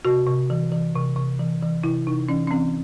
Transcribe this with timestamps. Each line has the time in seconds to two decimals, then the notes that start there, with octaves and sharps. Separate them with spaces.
0.05 C3 F#4
0.27 C3
0.50 E3
0.72 E3
0.95 C3
1.17 C3
1.39 E3
1.62 E3
1.84 C3 E4
2.07 C3 D#4
2.29 E3 C#4
2.47 C#4
2.51 E3 C4